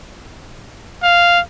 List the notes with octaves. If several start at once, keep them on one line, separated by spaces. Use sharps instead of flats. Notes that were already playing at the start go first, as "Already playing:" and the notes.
F5